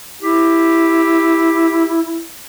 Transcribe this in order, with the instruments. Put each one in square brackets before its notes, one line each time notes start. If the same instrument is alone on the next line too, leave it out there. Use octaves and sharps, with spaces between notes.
[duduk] E4 [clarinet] G4